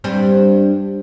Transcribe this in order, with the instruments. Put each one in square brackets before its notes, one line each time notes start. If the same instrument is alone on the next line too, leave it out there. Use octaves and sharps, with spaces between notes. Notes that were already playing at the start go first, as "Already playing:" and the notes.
[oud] G2 G3 C4